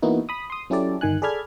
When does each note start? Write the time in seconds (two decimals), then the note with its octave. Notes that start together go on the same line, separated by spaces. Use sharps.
0.02 E3 A#3 B3 D#4 E4 F#4
0.29 B5 D#6
0.50 C6 D#6
0.70 F#3 C#4 E4 G4 A4 D5
1.01 G1 D#3 G#5 F#6
1.22 G#4 A4 D5 B5 F6 G#6